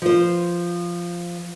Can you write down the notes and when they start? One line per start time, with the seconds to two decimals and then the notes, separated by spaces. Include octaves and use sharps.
0.02 F3 C5